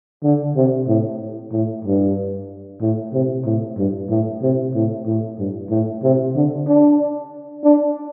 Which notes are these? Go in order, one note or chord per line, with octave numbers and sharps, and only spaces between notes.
D3
C3
A2
A2
G2
A2
C3
A2
G2
A2
C3
A2
A2
G2
A2
C3
D3
D4
D4